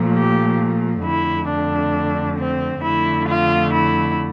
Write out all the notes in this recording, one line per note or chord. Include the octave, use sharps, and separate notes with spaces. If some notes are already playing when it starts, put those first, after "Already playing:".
Already playing: A#2 F3 A3
G4
F2 D3 A3 E4
D4
C4
F2 D3 A3 E4
F4
E4